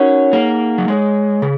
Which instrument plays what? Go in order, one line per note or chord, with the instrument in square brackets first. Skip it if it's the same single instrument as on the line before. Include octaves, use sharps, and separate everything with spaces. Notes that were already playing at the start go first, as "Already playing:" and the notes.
Already playing: [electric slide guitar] C#4 [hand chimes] D#4 F#4 A#4 C#5 F#5
[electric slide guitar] A#3 [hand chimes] D#4 G#4 F#5
[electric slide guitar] F#3
[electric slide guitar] G#3 [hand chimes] G#4 C#5 G#5
[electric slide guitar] C#3 [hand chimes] G#4